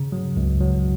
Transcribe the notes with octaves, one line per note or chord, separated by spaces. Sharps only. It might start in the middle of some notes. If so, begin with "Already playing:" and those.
Already playing: C#3
F#3
C#2
F#3